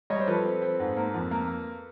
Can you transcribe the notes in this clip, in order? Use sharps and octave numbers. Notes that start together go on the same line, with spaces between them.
G3 C#5 D#5
C5
F3 A4 B4
C4
C4
G#2
A#3
F2
A#3